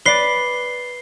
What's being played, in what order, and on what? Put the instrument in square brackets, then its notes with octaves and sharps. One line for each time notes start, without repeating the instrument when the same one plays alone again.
[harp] B4 D5 [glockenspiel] C7 G7